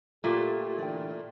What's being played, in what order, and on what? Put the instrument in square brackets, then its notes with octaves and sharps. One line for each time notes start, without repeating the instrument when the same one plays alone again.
[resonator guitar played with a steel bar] A#2 A3 [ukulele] F4 [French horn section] G4
[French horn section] D3 E3 D4 [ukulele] D5 G5